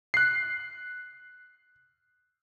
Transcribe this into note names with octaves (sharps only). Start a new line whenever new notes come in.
F#6 C7